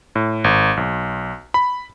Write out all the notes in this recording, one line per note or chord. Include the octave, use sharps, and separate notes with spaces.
A2
G#1
B1
B5